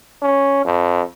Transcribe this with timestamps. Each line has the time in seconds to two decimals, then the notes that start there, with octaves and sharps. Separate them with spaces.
0.22 C#4
0.65 F2